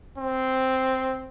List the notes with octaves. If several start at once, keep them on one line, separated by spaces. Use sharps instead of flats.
C4